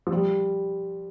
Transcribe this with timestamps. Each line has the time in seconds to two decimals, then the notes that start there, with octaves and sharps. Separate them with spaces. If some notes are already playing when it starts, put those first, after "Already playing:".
0.07 F3
0.12 G3